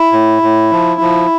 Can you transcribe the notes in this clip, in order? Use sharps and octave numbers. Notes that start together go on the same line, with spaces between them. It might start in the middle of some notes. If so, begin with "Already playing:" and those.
Already playing: E4
A2
A2
F3
F3